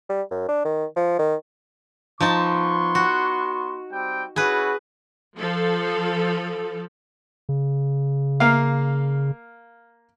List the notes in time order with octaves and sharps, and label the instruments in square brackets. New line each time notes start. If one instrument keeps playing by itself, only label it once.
[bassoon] G3
F#2
D4
D#3
F3
D#3
[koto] F3 D#4 A5 [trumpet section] B3 C6 C#6
[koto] F#4
[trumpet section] G3 C4 G5
[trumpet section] C#4 E4 F#4 [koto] G#4 B4
[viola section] F3 A4
[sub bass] C#3
[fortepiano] A#3 F5